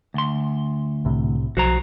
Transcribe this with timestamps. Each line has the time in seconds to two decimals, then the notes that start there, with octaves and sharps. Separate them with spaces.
0.14 D2 C6
1.05 C2 A2 C3
1.57 B1 F3 F#4 C5 A#5